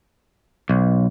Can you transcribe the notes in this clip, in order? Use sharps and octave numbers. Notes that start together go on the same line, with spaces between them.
B1